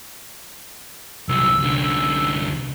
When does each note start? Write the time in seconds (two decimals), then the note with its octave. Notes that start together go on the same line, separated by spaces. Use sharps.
1.29 C2 F#3 E6
1.62 C2 D3